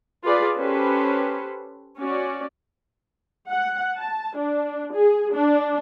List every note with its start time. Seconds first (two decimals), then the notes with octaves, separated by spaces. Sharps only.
0.24 F4 G#4 B4 D5
0.57 C#4 G4 A4 B4 C5
1.99 C#4 F#4 D5
3.49 F#5
3.98 A5
4.38 D4
4.93 G#4
5.33 D4